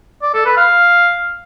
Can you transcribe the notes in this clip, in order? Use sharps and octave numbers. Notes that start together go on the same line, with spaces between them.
D5
A4
B4
F5